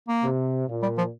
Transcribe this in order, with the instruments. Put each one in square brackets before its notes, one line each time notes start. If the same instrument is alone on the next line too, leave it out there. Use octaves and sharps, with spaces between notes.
[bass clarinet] A#3
[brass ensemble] C3
A#2
[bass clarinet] G3
F3